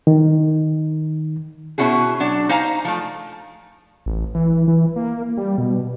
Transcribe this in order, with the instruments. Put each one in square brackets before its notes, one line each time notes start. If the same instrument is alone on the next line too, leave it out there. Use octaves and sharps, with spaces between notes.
[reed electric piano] D#3
[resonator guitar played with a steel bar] B2 C#4 E4 F#4 G#4
F#3 D4
D#4 C5 F5 G#5 A#5
F3 A3
[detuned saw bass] A1
E3
E3
A#3
G3
B2